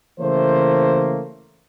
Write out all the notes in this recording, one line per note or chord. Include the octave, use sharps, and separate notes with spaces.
C#3 E3 A3 A#3 C5